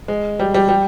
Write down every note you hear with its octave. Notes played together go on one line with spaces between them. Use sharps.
G#3
G3
G3
G3